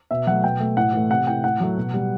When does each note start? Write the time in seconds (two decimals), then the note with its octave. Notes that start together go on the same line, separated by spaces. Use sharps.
0.11 B2 E5
0.27 F#3 A3 F#5
0.44 B2 G5
0.60 A3
0.77 A2 F#5
0.93 E3 A3
1.10 C3 F#5
1.27 E3 A3 G5
1.44 A2 F#5
1.60 F#3 A3
1.77 B2
1.94 G3